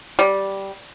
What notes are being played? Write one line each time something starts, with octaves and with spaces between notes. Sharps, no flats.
G3